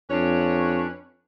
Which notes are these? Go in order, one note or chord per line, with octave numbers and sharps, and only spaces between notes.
F2 C#4 D4 B4 C#5